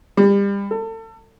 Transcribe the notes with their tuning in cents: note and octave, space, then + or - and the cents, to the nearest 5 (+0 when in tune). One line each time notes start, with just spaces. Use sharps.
G3 +30
A4 +35